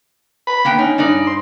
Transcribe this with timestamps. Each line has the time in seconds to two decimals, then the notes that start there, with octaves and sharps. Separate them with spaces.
0.47 B5
0.65 A#3 B3 G5
0.79 C#4 D#4
0.98 G2 D#4 D5
1.27 C6